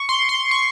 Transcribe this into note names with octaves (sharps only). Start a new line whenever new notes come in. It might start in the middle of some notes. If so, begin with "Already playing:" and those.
Already playing: C#6
C6
C6
C#6